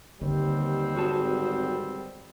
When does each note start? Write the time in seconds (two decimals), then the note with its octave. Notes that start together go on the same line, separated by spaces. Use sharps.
0.21 D#2 D3 D#3 G3 B3 C4
0.96 G#1 F#4 G#4 A5